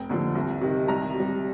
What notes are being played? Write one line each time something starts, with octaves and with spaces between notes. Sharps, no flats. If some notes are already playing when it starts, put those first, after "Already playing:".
Already playing: F1 G5
D#2 D3 F3
C2
C3 D#3
C2 A#5
C3
G3